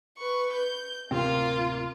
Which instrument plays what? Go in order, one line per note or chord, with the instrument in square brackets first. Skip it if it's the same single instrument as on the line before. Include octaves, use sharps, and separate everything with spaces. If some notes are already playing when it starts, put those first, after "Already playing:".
[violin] B4 C#6
G6
[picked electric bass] D1 C3 C4 [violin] A#3 F4